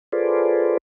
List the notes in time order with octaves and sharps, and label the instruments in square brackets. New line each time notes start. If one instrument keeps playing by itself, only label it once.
[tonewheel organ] F4 G#4 A4 B4 C5 D5